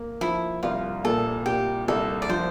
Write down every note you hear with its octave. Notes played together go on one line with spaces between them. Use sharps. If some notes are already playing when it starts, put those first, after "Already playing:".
Already playing: A#3
F3 E4
C2 F4
A#2 A4
A#2 G4
C2 A4
D5
F3 C5